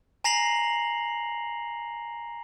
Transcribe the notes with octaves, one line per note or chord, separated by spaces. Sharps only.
G#5 A#5 A#6 C7 F7 F#7